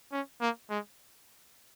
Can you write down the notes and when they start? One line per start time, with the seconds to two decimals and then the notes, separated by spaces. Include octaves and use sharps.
0.12 C#4
0.41 A#3
0.70 G#3